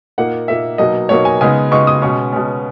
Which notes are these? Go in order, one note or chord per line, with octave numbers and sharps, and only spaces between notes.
A#2 A#3 D#4 F#5
A#2 A#3 D#4 E5
B2 F#3 A#3 D#4 D#5
B2 F#3 A#3 D#4 C#5
G#5
C#3 G#3 B3 D#4 G#5
C#3 G#3 B3 D#4 C#6
D#6
B2 G#3 C#4 C#6
B2 G#3 C#4